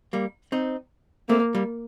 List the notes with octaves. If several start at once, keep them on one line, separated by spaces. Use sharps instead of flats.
G3 A#3
C4 D#4
A3 A#3 C4
G3 A#3